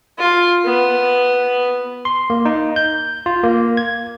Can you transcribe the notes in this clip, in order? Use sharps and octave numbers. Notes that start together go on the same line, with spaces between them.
F4
B3
C6
A#3
D#4
G6
F4
A#3
G#6